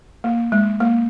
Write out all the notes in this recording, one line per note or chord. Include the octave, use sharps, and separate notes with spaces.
A#3
G#3
A#3